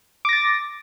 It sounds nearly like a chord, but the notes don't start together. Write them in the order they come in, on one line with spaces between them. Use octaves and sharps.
D6 A#6 A6